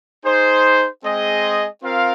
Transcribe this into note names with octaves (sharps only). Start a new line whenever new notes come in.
D#4 G#4 C5
G#3 C4 G#4 D#5
C4 F4 A#4 F5